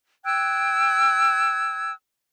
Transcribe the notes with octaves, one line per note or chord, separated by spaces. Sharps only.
G5 E6 F#6 G#6